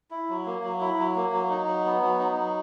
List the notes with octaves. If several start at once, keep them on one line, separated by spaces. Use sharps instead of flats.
E4
F#3
A#3
F#3
E4
F#3
A#3
F#3
D#4
F#3
B3
F#3
D#4
F#3